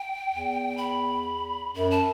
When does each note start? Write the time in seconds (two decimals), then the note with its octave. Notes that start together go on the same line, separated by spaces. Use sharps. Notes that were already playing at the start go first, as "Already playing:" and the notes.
Already playing: G5
0.29 E2
0.78 B5
1.74 F#2 B5
1.91 A5